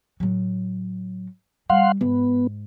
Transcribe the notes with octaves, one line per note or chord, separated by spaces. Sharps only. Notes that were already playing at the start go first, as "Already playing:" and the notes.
A2 F#3
G3 F5 F#5 C6
G#2 B3